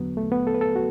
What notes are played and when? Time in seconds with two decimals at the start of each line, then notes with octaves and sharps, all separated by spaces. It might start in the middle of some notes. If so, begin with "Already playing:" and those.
Already playing: E2 D3 F#3 B3
0.17 A3
0.32 B3
0.47 A4
0.54 B4
0.61 A4
0.76 F#4